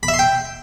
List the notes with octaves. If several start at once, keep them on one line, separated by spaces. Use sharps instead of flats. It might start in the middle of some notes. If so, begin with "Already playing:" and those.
B5
E5
C6
G5